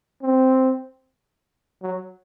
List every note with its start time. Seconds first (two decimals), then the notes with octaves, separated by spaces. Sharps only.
0.22 C4
1.82 F#3